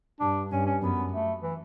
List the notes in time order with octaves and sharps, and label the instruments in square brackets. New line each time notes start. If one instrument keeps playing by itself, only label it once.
[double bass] G2 [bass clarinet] D4
[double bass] G2 [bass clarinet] C#4
[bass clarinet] C#4
[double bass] F#2 [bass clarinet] B3
[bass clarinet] A3
E3